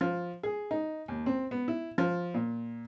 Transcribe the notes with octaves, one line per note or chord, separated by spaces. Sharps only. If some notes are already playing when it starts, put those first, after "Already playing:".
F3
G#4
D#4
D#2
C4
B3
E4
F3
A#2